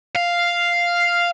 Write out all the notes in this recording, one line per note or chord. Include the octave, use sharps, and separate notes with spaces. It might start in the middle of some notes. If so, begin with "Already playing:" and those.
F5